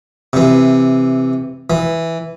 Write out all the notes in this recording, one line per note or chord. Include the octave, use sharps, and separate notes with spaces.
C3 E3
E3